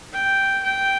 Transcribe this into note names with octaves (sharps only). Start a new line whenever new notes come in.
G5
G5